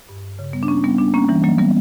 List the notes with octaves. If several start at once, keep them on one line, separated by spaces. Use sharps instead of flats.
G2
C#3
G3 B3
D4
A#3 C#4
G3 B3
B3 D4
A#3 C#4
E3 G3
F#3 A#3
G3 B3